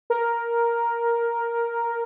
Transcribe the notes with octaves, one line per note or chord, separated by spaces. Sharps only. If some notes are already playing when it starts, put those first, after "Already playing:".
A#4